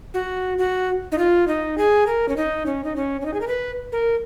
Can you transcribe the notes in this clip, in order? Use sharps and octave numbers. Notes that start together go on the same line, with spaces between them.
F#4
F#4
D#4
F4
D#4
G#4
A#4
C#4
D#4
C#4
D#4
C#4
C#4
D#4
G#4
A#4
B4
A#4